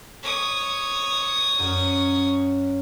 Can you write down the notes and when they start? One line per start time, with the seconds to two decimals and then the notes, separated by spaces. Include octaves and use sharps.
0.23 C#5 D#6
1.59 F#2